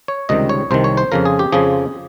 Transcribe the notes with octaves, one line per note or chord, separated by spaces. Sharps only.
C#5
C#2 C3 D#3 G3 D#5
C#5
C2 C3 D#3 C5
C#5
C5
F2 C#3 F3 A#4
G#4
G4
F2 C#3 F3 G#4